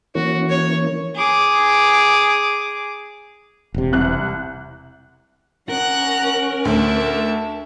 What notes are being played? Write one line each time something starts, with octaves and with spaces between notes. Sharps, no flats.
E3 A#3 C#4 F#4
C#5
G#4 D6
E1 C3
C2 F#6
C#4 A#4 F#5 F#6
D2 E5 A5